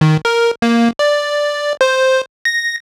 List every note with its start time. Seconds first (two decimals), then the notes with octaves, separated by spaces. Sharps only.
0.01 D#3
0.25 A#4
0.62 A#3
0.99 D5
1.81 C5
2.45 A#6